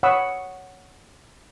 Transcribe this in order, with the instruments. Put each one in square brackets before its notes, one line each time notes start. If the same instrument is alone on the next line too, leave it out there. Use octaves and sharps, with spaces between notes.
[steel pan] C#5 F#5 B5 C#6 D#6 E6